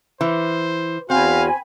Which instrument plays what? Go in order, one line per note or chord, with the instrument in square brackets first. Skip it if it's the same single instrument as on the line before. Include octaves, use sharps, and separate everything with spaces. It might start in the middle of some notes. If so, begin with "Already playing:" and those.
[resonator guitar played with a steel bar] E3 [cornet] C5
[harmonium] E2 F#4 [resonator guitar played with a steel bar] C4 [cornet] F5 [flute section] G#5 B5